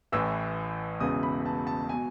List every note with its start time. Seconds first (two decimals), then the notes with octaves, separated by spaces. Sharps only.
0.12 A1 A2 E3 E6
1.00 E1 E2 C#3 E3 D#6
1.23 B5
1.46 A5
1.67 A5
1.89 B2 G#5